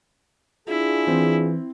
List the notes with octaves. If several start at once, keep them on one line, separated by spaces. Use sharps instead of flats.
D4 E4 F4 G#4
E3 C4